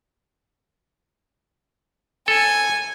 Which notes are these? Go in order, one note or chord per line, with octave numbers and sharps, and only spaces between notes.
A4 G#5